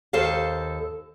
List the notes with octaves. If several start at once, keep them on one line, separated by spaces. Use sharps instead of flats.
D#2 A4 C5 D#5 F5